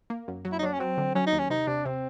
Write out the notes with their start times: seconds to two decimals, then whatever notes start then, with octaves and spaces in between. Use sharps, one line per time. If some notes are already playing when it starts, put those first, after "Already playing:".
0.10 A#3
0.28 F#2
0.45 F#3
0.52 E4
0.59 D#4
0.63 F#3 D4
0.73 C#4
0.79 F#3 C4
0.98 D3
1.15 F#3 C#4
1.27 D#4
1.33 D#2
1.39 C#4
1.50 C3 D#4
1.67 C3 D4
1.85 C3 C4